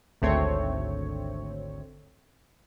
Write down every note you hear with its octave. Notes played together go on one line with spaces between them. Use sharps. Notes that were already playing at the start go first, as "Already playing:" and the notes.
G#1 D2 A3 C4 C#5